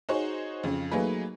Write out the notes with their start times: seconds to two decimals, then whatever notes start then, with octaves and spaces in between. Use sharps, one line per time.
0.09 D#4 F#4 G#4 C5 C#5
0.64 F2 C#3
0.91 F#3 A3 A#3 D#4 G#4 B4